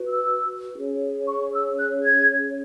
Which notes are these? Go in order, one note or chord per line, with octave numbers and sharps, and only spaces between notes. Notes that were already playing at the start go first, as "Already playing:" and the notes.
Already playing: F#4 B4
E6
C#4 G#4 C#5
C#6
E6
F#6
G#6